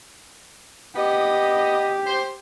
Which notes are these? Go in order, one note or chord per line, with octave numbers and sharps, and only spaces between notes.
B3 G4 D5 D#5
C5